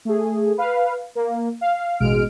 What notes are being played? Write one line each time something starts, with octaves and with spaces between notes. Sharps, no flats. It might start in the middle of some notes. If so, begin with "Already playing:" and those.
A3 G#4
B4 F5
A#3
F5
A1 B2 G#3 F6 D7